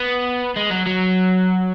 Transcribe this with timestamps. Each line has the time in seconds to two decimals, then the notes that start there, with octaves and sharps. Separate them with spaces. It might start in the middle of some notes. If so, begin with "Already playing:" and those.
Already playing: B3
0.57 G#3
0.71 F#3
0.87 F#3